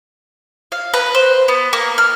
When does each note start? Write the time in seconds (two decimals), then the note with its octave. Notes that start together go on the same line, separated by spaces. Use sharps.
0.72 F5
0.94 B4
1.14 C5
1.48 B3
1.73 A#3
1.98 F6